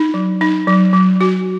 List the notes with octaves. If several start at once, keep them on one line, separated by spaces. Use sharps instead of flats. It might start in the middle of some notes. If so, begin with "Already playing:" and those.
Already playing: D#4
F#3
D#4
F#3
F#3
F#4